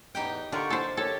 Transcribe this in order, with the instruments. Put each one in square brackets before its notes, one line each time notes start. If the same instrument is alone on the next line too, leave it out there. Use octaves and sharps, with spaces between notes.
[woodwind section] E2 A2 E3 [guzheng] D#4 G4 G5
[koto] D3 [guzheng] F4 A#4 [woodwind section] G4 F#5 C#6
[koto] A4 C5
[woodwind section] G4 A#4 C#5 [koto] A4